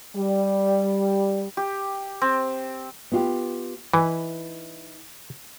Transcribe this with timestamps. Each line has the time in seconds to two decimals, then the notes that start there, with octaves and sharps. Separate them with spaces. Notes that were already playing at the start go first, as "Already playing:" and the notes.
0.15 G3
1.57 G4
2.22 C4
3.12 B3 F4 G4
3.94 E3 D#4 E4 B4